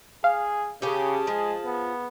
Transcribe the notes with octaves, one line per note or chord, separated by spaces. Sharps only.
G#4 F5
C#3 C#4 G4 G#4 A5
F3 G#3
B3